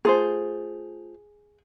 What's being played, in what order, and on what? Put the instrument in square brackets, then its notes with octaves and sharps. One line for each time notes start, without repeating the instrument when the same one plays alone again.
[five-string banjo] A3 F4 C5 [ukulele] G#4